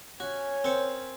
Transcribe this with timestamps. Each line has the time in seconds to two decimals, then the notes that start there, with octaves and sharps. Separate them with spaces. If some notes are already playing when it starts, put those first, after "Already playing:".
0.20 C#4 F#4 C#5 G#5
0.64 C4 A#4 C5 C#7